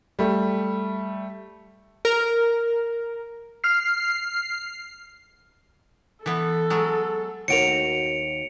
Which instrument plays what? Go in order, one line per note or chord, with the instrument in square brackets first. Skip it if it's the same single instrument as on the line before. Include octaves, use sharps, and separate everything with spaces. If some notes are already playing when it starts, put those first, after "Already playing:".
[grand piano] G3 A3
[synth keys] A#4
[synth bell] F6 C7
[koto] E3 B3 [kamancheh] A4
[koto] F#3 G#3
[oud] D#2 F#4 A#4 [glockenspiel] C#7 D7 F7